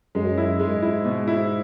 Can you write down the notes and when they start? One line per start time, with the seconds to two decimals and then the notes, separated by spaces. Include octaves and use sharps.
0.15 F#2 G#3
0.37 E4
0.60 G#2 G#3
0.83 E4
1.05 B2
1.28 E4